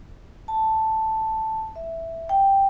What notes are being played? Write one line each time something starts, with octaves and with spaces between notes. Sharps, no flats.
A5
E5
G5